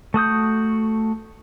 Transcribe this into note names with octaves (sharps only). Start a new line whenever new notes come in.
A3 F#4 D#6 G6